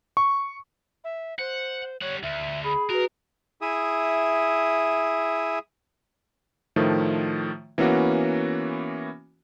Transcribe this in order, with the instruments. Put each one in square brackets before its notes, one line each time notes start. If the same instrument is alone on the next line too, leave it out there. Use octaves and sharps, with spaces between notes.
[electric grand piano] C#6
[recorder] E5
[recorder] C5 [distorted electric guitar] F#5
[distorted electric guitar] G3 F#5 [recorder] C#5
[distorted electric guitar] D2 [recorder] E5
[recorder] G#4 [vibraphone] B5
[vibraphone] F#4 B4 [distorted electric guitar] A#4
[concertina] E4 G#4 E5 D#6
[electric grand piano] A2 D#3 F3 A3
E3 A#3 B3 C#4 F#4